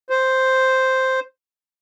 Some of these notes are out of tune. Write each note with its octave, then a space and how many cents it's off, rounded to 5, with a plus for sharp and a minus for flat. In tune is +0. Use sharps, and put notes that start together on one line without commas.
C5 +0